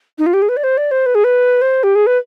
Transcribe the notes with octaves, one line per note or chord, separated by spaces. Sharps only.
D#4
F4
G4
G#4
B4
D5
C5
D5
C5
B4
G#4
B4
C5
G4
G#4
B4